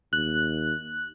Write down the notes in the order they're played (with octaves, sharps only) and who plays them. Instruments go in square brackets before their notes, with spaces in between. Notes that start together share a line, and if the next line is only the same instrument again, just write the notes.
[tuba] D#2 [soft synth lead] F#6